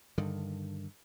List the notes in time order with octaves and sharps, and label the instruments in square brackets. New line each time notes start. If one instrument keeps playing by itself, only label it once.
[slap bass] G2 D3 D#3